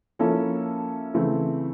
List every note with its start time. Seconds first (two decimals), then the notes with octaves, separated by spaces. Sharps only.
0.19 F3 A#3 C#4 E4 A4
1.14 C#3 E3 A3 C4